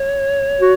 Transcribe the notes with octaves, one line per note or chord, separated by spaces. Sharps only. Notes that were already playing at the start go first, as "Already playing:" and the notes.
Already playing: C#5
F#4